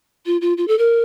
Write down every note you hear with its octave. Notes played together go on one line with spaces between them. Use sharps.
F4
F4
F4
A4
A#4